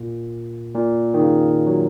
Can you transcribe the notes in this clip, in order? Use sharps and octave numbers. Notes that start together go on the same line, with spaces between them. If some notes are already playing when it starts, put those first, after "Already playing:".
Already playing: A#2
A#2
D#3
C#3
F#3